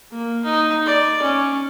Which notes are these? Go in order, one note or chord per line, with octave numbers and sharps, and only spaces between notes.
A#3
D#4
D5
C#4